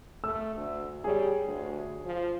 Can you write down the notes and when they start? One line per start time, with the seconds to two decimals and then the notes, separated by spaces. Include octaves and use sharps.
0.24 A3 E6
0.56 D2
1.04 G3 G#4 C#5
1.44 D2
2.05 F3